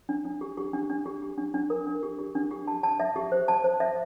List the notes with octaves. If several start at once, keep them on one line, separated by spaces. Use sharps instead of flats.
D4
D4
G4
G4
D4
D4
G4
G4
D4
D4
A#4
D4
G4
G4
D4
G4
A5
A5
E5
G4
C5
A5
C5
E5